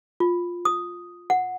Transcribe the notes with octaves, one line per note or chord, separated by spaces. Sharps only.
F4
D#6
F#5